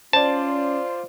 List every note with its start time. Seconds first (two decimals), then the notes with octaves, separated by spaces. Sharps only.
0.13 C#4 F4 C5 D5 A5